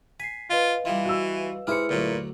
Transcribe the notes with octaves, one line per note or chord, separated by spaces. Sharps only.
G#5 B6 C7
F4 B4 D#5 F5
E3 G3 F4
F#4 E6
G#3 E4 G4 G#4 B4 C5 F6 C#7
D2 A#2 F#3